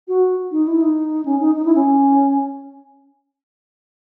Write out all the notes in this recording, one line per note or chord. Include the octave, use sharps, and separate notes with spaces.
F#4
D#4
E4
D#4
C#4
D#4
D#4
E4
C#4